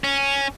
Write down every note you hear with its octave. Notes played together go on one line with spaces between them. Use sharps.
C#4